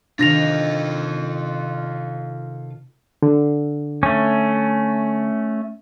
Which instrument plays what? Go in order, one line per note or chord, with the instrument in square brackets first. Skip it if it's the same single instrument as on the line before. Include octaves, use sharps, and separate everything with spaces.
[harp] C3 D#3 [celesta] D4 A#6 F7 [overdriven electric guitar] F4 A4
[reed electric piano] D3
[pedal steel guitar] A3 C#4